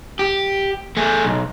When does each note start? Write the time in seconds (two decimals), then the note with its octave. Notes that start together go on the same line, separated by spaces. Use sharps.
0.19 G4
0.97 A3 G#4
1.25 B1